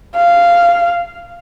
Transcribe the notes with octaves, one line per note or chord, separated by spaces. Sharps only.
F5